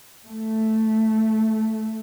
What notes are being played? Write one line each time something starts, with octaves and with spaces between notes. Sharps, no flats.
A3